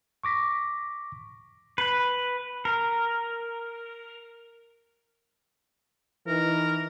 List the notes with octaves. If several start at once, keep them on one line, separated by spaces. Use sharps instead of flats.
C#6 D6 A#6 B6
B4
A#4
E3 D#4 A#4